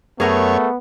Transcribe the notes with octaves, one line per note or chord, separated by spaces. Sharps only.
F#2 A3 B3 G#4 A#4 C#5 F#5